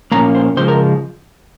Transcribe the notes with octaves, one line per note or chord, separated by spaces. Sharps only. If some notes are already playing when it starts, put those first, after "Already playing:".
A#2 F3 A#3 C#4 A#5
C5
C#3 F3 G#3 C5
A#4